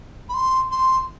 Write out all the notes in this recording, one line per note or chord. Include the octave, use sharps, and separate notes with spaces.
B5
C6
C6